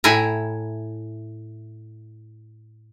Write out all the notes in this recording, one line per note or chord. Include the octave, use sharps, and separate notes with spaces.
A2 E4 G5 G#5 A#5